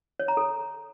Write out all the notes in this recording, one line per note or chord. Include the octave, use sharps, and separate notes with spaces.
C#5
A#5
A4